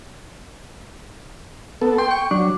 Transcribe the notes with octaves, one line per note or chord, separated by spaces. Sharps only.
B3 A4
G5 C6
C#6
F#3 D4